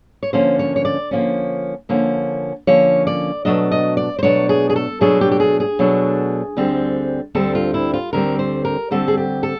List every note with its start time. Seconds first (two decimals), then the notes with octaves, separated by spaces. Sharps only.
0.23 C#5
0.33 D3 F3 A#3 C#4 C5
0.59 C#5
0.76 C#5
0.85 D5
1.11 D3 F3 A#3 C#4
1.89 D3 F3 A#3 C#4
2.67 D3 F3 A#3 C#4 C#5
3.07 D5
3.45 B2 F#3 A3 D4 D#5
3.72 D#5
3.97 D5
4.19 C5
4.23 B2 F#3 A3 D4 C#5
4.49 G#4
4.70 G#4
4.76 A4
5.01 B2 F#3 A3 D4 G#4
5.21 G4
5.32 G4
5.40 G#4
5.60 G#4
5.79 B2 F#3 A3 D4
6.57 D2 D3 G3 C4
7.35 D2 D3 G3 C4 A4
7.55 F4
7.74 E4
7.94 F4
8.13 D2 D3 G3 C4 A#4
8.39 C5
8.65 A#4
8.91 D2 D3 G3 C4 A4
9.08 G#4
9.18 G4
9.43 A4